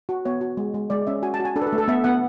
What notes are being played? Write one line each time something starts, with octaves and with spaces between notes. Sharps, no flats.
F#4
B3 C#5
F#4
G#3
G#3
G#3 D5
C#4 E5
F#4 G#5
A5
F#4
G#5
D4 A4
B4
A4
A3
A4
B3 E5
B3 F#5